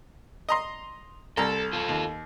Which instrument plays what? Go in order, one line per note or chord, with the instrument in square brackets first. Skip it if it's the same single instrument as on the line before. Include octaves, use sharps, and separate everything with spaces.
[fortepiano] D#5 A#5 C6
[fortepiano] C2 A#5 [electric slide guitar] A4
[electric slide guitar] F4 A4
[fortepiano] D#2